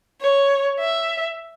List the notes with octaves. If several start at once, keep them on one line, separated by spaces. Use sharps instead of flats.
C#5
E5